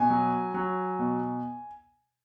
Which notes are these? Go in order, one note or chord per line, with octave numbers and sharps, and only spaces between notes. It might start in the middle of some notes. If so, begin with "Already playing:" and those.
Already playing: B2 G#5
F#3
F#3
B2